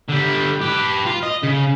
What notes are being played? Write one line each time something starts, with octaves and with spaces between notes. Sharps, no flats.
D3 G3
G4 B4
F4
D#5
C#3